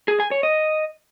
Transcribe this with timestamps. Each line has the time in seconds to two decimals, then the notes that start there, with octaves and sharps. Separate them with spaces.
0.08 G#4
0.20 G#5
0.31 C#5
0.43 D#5